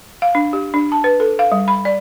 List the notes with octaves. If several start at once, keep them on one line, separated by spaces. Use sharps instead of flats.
F5
D4
G4
D4
A5
B4
A4
F5
G3
B5
D5